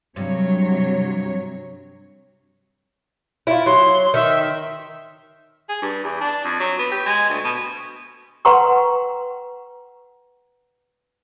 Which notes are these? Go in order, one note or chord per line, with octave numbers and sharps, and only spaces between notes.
G2 C3 F#3 C#5
E4 F4
F#3 C6
D#3 E5
G#4
G2
E2
D4
F2
F#3
B3
G4
G#3
D2
B2
B4 F#5 G5 A#5 C6 C#6